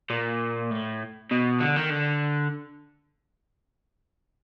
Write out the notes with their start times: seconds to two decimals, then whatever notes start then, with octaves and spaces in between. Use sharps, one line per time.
0.10 A#2
0.71 A2
1.31 B2
1.60 D3
1.76 D#3
1.90 D3